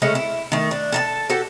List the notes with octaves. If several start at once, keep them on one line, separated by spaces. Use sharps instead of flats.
C#3 G#3 A3 C#4
E4
D#3 A3
D4
A4 D#5 A5
F#4 G4 A4